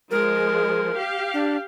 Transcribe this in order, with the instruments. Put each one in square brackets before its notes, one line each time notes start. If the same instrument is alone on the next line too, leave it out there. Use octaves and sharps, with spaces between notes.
[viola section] F3 G#3 [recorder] A#4
[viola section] G4 F5
[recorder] D4